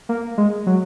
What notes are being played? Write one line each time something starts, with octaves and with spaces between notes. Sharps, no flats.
A#3
G#3
F#3